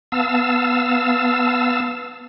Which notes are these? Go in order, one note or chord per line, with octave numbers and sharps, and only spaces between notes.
B3 F5 A5 E6